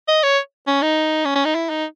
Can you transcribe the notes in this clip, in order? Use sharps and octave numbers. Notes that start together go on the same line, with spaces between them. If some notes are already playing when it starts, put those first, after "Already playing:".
D#5
C#5
C#4
D#4
C#4
C#4
D#4
E4
D#4